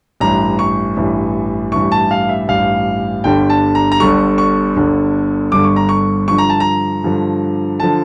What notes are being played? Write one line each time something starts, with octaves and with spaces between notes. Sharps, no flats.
A1 G2 E3 A#5
C#6
A1 G2 E3
A1 G2 E3 C#6
A5
F5
E5
A1 G2 E3 F5
G1 G2 D3 G3 G5
A5
A#5
A#5
G1 G2 D3 G3 C#6
C#6
G1 G2 D3 G3
G1 G2 D3 G3 D6
C#6
A#5
C#6
G2 D3 F3 C#6
A#5
A5
A#5
G2 D3 F3
D3 F3 A5